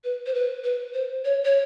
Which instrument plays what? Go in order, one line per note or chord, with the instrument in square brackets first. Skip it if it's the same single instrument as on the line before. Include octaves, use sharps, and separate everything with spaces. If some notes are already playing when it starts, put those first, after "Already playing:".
[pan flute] B4
C5
B4
B4
C5
C#5
C#5